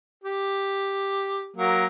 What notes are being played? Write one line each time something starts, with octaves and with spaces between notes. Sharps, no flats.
G4
F#3 A#3